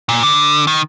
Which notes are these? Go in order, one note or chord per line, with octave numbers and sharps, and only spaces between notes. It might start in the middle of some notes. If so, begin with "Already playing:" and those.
A#2
D3
D#3